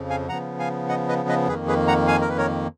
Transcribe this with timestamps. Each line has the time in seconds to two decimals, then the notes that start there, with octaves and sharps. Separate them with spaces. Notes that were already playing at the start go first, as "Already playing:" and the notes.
Already playing: F2 C#3 F3
0.10 F5 G#5
0.29 C#3 F3 B3 F#5 A#5
0.59 F5 G#5
0.89 D#5 F#5
1.08 B4 D#5
1.29 B4 D#5
1.48 F2 D#3 A#3 G#4 B4
1.68 G#4 B4
1.88 F#5 A#5
2.07 F5 G#5
2.21 A#4
2.30 B4
2.37 A#4 C#5